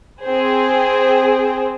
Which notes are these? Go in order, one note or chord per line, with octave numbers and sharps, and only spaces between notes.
C4 G#4 C5